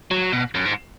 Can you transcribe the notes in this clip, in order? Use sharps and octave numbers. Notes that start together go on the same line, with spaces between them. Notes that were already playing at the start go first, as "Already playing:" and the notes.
F#3
B2
F#2
G#2